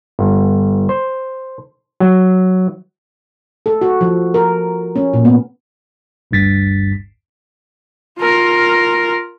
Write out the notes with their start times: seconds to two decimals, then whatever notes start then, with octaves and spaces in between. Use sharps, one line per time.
0.19 G1
0.89 C5
2.00 F#3
3.66 A4
3.81 F#4
4.01 F3
4.34 A#4
4.96 C#4
5.13 A#2
5.25 B3
6.31 G1 D2 G2 A6 B6
8.19 F4 A#4